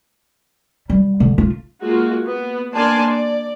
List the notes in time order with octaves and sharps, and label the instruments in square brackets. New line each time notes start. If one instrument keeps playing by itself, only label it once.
[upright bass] G3
D3
F4
[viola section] G#3 A#3 F4 F#4
B3
A#3 D4 D5 G#5 A5 C6
D5